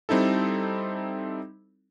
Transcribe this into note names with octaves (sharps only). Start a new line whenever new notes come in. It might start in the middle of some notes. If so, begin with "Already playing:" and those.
G3 C4 D#4 E4 A4